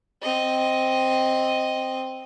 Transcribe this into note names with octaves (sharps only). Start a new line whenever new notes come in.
C4 D#5